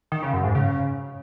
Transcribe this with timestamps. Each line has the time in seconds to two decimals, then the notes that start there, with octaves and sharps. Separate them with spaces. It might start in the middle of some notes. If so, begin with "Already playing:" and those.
0.12 D#3
0.22 C#3
0.33 F#2
0.44 G#2
0.55 C#3